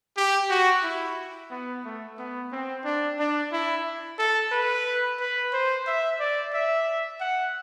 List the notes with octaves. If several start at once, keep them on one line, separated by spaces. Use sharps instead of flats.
G4
F#4
E4
B3
A3
B3
C4
D4
D4
E4
A4
B4
B4
C5
E5
D5
E5
F#5